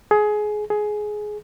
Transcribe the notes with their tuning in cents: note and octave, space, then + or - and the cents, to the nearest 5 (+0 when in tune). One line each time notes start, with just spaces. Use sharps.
G#4 +20
G#4 +15